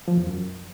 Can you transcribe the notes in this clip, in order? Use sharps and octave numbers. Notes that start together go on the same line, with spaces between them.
F3
E2
F#2